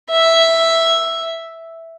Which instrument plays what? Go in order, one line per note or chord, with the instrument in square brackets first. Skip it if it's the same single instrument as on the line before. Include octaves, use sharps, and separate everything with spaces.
[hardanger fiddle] E5